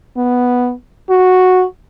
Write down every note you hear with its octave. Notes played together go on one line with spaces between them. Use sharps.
B3
F#4